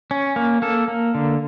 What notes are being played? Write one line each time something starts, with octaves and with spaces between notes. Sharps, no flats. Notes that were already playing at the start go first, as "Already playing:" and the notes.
C#4
A#3
A#3 A4
A#3
D3